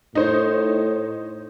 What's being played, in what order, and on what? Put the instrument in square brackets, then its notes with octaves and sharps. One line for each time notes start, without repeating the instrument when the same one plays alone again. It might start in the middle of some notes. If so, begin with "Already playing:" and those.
[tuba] A2 [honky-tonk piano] D#4 C5 C#5